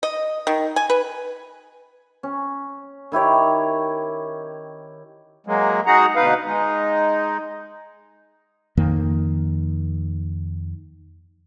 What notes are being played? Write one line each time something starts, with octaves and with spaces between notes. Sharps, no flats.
D#5
D#3
G#5
B4
C#4
D#3 E4 G4 C#5
F#3 G#3 A#3
D#4 F#4 G#4 F#5 A#5
D2 B2 D#4 B4 F5
G#3 D#4
F2 D#3 A#3